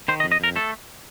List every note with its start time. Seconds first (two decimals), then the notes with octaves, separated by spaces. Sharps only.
0.08 D#3 C5
0.20 D#5
0.24 F2
0.32 D#5
0.40 F2 A#4
0.56 A3 A4